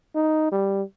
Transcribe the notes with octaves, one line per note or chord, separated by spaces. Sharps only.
D#4
G3